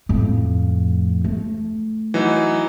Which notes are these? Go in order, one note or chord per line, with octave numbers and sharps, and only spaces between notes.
F2 A2
A3
E3 F#3 D#4